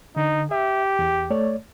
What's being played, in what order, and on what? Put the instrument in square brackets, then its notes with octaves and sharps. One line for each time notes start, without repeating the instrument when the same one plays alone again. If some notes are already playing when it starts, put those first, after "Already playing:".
[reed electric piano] D3 [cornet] D#4
[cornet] G4 [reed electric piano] E5
[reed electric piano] E2
A3 C#5 D5